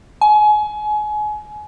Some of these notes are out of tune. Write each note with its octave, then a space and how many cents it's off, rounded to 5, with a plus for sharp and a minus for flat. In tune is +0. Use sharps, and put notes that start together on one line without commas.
G#5 +30